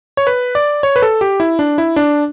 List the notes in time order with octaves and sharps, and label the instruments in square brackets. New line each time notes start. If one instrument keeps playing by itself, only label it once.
[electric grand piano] C#5
B4
D5
C#5
B4
A4
G4
E4
D4
E4
D4